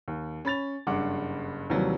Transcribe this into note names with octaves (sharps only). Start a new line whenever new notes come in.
D#2
C#4 B5 A6 F7
F#1 G2 F#5 D6
D#2 C3 E3 F#3 G3